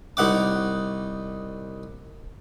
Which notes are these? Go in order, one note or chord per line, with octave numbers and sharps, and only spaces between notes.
C2 D#4 F#5 D6